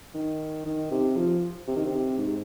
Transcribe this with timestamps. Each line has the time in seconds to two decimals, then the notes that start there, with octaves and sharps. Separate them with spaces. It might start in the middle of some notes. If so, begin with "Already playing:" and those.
0.14 D#3
0.65 D#3
0.91 C3
1.17 F3
1.67 C3
1.76 D#3
1.86 C3
2.18 G#2